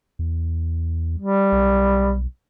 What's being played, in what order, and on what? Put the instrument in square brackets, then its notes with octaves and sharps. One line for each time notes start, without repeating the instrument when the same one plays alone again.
[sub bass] E2
[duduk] G3
[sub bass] B1